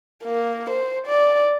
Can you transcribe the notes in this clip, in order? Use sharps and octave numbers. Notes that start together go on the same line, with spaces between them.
A#3
C5
D5